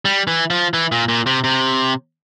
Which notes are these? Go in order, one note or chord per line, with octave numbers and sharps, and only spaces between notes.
G3
E3
F3
E3
A#2
A#2
C3
C3